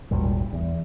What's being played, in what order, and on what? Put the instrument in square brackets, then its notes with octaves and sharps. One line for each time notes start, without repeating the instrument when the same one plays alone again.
[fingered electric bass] G#1 D#2 A#2 G3
E2